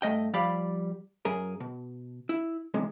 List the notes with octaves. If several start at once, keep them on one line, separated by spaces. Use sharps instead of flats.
G2 A3 D#5 G5
F3 G3 G4 D5 F5 B5
F#2 G#4 A#4
B2
E4
B1 E2 C3 G#3